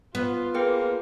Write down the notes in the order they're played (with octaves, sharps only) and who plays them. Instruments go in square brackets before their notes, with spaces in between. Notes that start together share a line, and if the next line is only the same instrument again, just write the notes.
[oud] B3 [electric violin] F4
[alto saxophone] A#3 [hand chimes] G#4 B4 G5